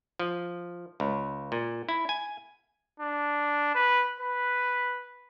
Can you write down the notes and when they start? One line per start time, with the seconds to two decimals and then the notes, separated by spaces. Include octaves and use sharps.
0.19 F3
1.00 C#2
1.52 A#2
1.89 E4
2.09 G#5
3.00 D4
3.75 B4
4.20 B4